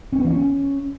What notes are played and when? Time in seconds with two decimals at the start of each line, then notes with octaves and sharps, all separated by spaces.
0.13 C#4
0.19 B3
0.25 E3
0.31 C#4